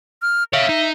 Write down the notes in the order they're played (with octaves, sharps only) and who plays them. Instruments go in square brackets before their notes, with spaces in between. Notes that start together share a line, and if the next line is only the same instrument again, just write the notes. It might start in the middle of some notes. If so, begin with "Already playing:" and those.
[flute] F6
[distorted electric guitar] C#5 F5 [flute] E5
[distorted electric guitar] D#4